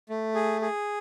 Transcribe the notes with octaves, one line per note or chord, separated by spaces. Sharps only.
A3
G#4
G#4